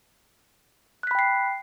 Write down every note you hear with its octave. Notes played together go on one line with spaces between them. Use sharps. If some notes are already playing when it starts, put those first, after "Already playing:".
G5 B5 F#6 B6 C7